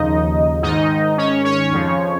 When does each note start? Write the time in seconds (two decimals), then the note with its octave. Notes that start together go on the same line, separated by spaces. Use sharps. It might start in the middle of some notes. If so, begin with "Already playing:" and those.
Already playing: D#2 C#3 F3 D#4 D#5
0.63 G#2 D#3 D#4 D#5
1.18 C#4 C#5
1.45 C#4 C#5
1.72 F2 C#3 F3